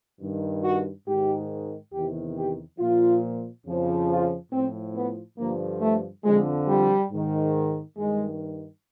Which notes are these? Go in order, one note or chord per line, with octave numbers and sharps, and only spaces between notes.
G2 D#3
F#4
G#2 D#3 G4
E2 C3 D#3 G4
G4
A#2 F3 F4
F2 C#3 F3
F4
A2 F3 C4
B3
G2 D3 F3 A#3
A3
F2 D3 F3 G#3
G3
G#2 D#3
G2 D#3 G#3